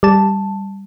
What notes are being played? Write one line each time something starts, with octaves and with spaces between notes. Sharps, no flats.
G3 A5